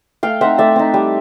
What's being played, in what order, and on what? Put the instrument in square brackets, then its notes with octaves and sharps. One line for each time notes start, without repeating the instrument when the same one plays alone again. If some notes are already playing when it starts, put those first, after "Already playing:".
[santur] A3 F5 G5
C4 D#4 E5 F#5
A3 D5 E5
C4 D#4
G3